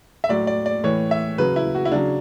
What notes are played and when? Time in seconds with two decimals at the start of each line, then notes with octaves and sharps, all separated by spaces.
0.24 E5
0.29 A2 F#3 D5
0.47 D5
0.66 D5
0.84 A2 E3 C#5
1.11 E5
1.38 C#3 F#3 B4
1.56 E4
1.75 F#4
1.85 E4
1.92 C#3 F#3 D4